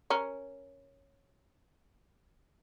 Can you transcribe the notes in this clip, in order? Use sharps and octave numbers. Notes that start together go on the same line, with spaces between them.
C#4 A#4